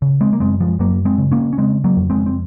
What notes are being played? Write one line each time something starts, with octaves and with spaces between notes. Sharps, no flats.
C#3
G#3 C4
A#3
F#2 G#3 C4
F3 G#3
F#2 F#3 A#3
G#3 C4
C#3
A#3 C#4
C#4
C#3 G#3 C4
F#3 A#3
F2
G#3 C4
C4